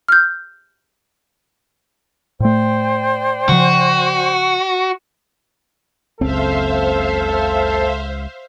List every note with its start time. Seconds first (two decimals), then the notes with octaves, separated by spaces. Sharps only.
0.08 F6 G6
2.40 A2 A3 C5 D5 G5
3.49 C#3 F3 F#4
6.21 F#1 C#2 C#3 C4 A4 C5 E5 F5